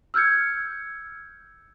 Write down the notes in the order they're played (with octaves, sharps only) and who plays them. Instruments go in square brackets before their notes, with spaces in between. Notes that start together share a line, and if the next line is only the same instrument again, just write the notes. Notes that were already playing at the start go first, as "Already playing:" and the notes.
[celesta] E6 F6 G6 G#6 C#7